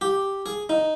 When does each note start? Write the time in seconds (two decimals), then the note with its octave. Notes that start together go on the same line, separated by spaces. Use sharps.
0.01 G4
0.46 G#4
0.69 D#4